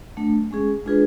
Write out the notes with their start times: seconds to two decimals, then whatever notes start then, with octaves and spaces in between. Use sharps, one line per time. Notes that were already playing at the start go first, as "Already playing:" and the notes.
0.17 F#3 A3 D4
0.51 G#3 C#4 G#4
0.85 G#3 D4 F4 G#4 B4